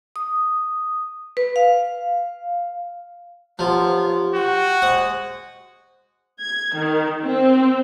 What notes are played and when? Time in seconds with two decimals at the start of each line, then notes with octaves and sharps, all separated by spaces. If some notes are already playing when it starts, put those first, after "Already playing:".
0.16 D#6
1.37 B4
1.56 F5
3.59 F3 F#3 B3 F4 G4
4.35 F#4 G5
4.82 G#3 C5 F#5 D#6
6.42 G#6
6.75 D#3
7.24 C4